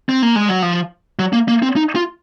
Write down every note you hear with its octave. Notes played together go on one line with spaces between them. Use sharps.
C4
A#3
G#3
F#3
F3
F#3
A#3
A#3
C4
D#4
F4